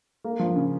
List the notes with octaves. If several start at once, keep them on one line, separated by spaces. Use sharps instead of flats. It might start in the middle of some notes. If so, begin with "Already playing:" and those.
A#3
F3
C#3